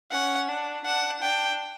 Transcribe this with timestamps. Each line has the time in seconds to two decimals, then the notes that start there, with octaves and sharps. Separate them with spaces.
0.12 C#4 F#5
0.49 D4
0.85 D4 F#5
1.22 D4 G5